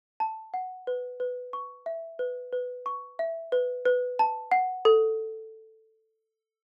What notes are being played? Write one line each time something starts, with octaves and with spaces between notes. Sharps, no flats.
A5
F#5
B4
B4
C#6
E5
B4
B4
C#6
E5
B4
B4
A5
F#5
A4